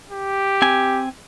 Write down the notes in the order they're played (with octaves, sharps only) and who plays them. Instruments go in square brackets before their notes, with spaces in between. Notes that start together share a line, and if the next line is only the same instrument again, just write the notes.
[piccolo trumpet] G4
[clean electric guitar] C4 G#5